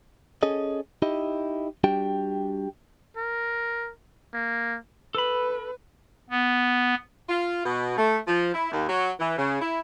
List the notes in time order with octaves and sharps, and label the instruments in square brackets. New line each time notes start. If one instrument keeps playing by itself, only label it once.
[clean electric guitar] C#4 G#4 A4 D#5
D#4 E4 G4 D#5
G3 D4 F#4 G4 G5
[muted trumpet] A#4
A#3
[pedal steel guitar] A4 B5 [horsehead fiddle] B4
[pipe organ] B3
[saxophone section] F4
B2
A3
F3
E4
D#2
F#3
E3
C#3
E4